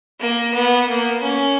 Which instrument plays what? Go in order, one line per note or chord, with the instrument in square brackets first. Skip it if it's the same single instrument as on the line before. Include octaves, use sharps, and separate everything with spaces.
[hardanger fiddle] A#3
B3
A#3
C#4